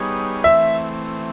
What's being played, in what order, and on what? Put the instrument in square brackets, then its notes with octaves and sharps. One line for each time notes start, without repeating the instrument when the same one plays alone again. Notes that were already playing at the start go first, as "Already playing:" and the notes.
Already playing: [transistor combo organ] G3 B3 D#4 G#4 C#5
[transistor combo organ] E3 A3 C4 [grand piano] E5